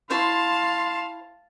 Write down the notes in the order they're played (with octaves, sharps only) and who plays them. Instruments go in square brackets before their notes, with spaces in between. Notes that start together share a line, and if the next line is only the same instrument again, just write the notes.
[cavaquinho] E4 C5 C#5 [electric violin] F5 [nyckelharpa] A5 [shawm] C6